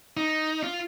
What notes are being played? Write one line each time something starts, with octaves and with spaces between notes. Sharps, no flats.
D#4
F4